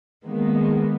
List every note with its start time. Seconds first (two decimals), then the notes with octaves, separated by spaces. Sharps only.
0.25 D#3 G#3 A#3 B3